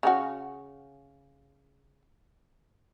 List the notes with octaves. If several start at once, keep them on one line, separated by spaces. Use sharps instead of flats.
C#3 C#4 F#4